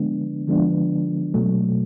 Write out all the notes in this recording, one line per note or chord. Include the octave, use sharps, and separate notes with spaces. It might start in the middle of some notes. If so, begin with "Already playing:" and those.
Already playing: D3 F3 G#3 B3 D4
D3 F3 G#3 B3 D4
B2 F#3 A3